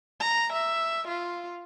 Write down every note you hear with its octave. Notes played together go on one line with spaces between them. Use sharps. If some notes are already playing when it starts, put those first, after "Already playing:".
A#5
E5
F4